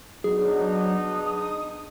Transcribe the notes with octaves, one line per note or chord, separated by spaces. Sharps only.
F#3 B3 D4 D#4 G#4
D#6